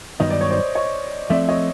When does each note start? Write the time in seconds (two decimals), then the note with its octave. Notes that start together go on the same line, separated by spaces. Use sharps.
0.20 G2 D#3 F#3 B3 D#4 D#5
0.31 D5
0.41 C#5
0.51 C5 D5
0.75 C#5 D#5
1.30 F3 A3 C4 D5 E5
1.48 C#5 D#5